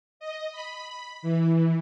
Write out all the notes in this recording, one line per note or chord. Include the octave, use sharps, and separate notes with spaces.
D#5
B5
E3